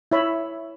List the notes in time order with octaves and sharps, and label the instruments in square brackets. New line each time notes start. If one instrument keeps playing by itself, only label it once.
[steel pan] E4 C#5 E5 B5